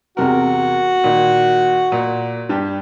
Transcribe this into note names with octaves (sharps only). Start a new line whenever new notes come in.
E2 C3 F#4 A#4
A#2 D#3
A#2
G2 G4